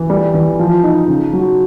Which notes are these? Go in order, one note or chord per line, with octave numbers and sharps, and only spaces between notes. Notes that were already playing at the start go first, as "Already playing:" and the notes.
Already playing: E3
G3
E3
F3
D#4
C#3
F#3